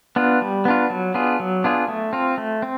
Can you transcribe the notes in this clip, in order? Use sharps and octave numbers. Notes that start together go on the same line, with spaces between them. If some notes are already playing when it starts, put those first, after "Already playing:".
B3 D4 F4
G3
B3 D4 F4
F#3
B3 D4 F4 G#4
F#3
B3 D4 F4 G#4
A3
C4 F4
A3
C4